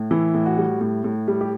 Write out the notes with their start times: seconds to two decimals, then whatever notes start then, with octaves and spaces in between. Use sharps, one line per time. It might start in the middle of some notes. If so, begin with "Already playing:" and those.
Already playing: A2
0.11 E3 E4
0.34 A2
0.46 F#4
0.57 G3
0.81 A2
1.04 A2
1.28 G3
1.41 G4